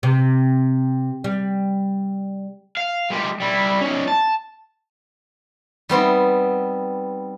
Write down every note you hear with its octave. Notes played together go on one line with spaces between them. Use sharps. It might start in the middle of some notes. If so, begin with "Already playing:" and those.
C3
G3
F5
G#3 G4
G3 E4
C#4 D#4
A5
G3 B3 C4 D#4